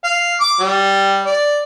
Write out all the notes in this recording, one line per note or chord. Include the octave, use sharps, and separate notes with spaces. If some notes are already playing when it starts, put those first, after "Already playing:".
F5
D6
G3
D5